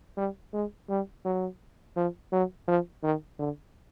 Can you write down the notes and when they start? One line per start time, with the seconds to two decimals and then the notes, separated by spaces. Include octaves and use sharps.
0.17 G3
0.53 G#3
0.89 G3
1.25 F#3
1.96 F3
2.32 F#3
2.68 F3
3.03 D#3
3.39 D3